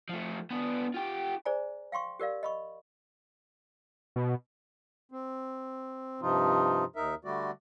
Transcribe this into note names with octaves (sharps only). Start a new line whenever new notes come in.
F3 A3
B3 D4
F4 G4
G#4 C5 D5 G#5 A#5
F5 G5 C6 C#6
G4 A#4 D5 F5
D#5 B5 C#6
B2
C4
G2 C3 F3 D#4 F4
D#2 D#4 A#4 E5
D3 G3 A3 F#4 D5